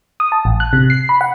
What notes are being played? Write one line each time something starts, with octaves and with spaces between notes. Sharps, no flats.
D#6
A5
A1
F#6
C3
C7
B5
F#5